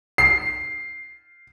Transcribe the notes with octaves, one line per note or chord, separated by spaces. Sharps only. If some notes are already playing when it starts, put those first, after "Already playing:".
C7